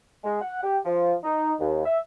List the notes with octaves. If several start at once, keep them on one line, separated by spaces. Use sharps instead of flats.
G#3
F#5
G4
F3
D#4
D#2
E5